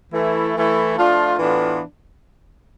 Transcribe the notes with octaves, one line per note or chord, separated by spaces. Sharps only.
E3 A3 E4
E3 A3 E4
F3 A3 D4 F4
A2 E3 B3 D4 F4